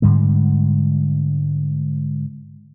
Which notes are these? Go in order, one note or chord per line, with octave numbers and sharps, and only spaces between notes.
G#2 D3 G3 G#3